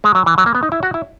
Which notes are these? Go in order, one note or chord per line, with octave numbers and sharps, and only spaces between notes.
G#3
F#3
E3
F#3
A#3
B3
D#4
E4
F#4
E4